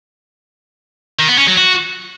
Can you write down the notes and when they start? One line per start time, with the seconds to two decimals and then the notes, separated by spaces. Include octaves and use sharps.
1.19 D#3
1.29 B3
1.38 C#4
1.48 F#3
1.57 F#4